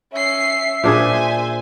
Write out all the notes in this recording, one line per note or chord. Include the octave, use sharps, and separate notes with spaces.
C#4 E5 C7
A#2 D4 G#4 C5 G#5